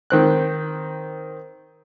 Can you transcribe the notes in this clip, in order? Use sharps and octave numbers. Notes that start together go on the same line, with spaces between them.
D#3 C4 F#6